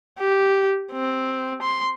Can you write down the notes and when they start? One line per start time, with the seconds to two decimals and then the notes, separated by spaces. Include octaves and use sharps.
0.19 G4
0.92 C4
1.62 C6